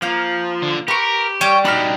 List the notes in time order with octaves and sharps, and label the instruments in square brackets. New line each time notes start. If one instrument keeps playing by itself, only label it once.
[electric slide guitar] F3 [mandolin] A#3 F5 G6
[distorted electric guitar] D3
[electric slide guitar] G4 [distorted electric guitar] A#4 [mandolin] B4 C#6
[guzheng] G3 [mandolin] C#4 C#5 [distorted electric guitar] G5
[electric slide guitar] D4 G4 [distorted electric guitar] D#4 F#4 [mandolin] B5 C#6 F6